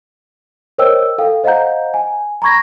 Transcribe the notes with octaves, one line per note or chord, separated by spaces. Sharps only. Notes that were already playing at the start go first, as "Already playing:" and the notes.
A#4 C5 C#5 D#5 G5 E6
A4 F5 G5
C5 D#5 F5 F#5 A#5 G6
G#5
A#5 B5 C#6 G#6 A#6